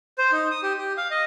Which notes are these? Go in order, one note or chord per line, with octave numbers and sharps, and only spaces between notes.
C5
D#4
D#6
G4
G4
F5
D#5